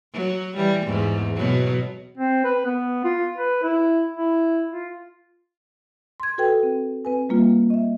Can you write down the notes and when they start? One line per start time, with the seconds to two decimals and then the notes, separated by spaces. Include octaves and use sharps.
0.13 F#3
0.56 E3 G3
0.86 E2 G#2
1.35 B2 F#3
2.18 C4
2.44 B4
2.65 B3
3.04 F4
3.38 B4
3.63 E4
4.17 E4
4.72 F4
6.20 C6 G#6
6.38 F#4 A4 B4 G5
6.63 C4
7.05 C4 B4 G#5
7.29 G3 A#3 F4
7.70 D#5 E5